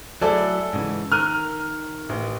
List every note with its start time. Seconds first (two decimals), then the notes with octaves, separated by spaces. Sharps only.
0.22 F#3 A3 E4 G#4 A4 D5
0.73 G#2 C#3 E3
1.12 D#3 A#4 F6 F#6 D#7
2.09 A1